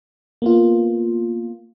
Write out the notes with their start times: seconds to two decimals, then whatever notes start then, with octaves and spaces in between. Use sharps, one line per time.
0.42 A#3 B3 F4